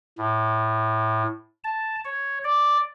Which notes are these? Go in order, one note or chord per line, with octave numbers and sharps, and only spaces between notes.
A2
A5
C#5
D5